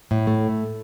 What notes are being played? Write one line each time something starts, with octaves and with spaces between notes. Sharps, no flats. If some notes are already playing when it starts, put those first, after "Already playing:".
A2
A3